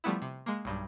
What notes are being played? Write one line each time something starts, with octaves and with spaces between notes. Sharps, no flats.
F3 G3 A3 B3 E4
C3
G#3 A#3
B1 G2